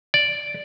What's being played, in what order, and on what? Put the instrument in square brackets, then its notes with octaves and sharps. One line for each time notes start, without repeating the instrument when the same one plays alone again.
[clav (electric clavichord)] D5